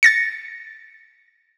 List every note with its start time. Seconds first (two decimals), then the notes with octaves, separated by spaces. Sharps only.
0.03 A6 A#6 C#7